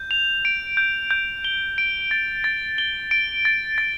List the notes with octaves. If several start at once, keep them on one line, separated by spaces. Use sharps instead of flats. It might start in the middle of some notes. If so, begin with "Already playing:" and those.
Already playing: G6
F7
D7
G6
G6
G7
D7
A6
A6
G7
D7
A6
A6